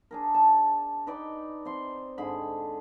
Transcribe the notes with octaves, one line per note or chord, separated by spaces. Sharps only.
D4 G#4 A#4
A5
D#4 B4 D5 G5
C4 C6
G#2 D3 G#4 B5